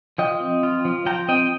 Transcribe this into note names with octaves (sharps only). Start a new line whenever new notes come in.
F3 D#5 G5
C4
F4
F3
F3 G5 A#5
C4 D#5 G5